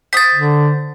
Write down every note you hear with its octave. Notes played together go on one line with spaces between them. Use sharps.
C5 D#6 A6 B6
D3